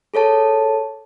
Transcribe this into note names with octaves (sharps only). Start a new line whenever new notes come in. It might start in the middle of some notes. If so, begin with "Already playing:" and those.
G#4 A4 C#5 A5